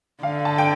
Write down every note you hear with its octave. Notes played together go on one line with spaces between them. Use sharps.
D3 F5
A5
G5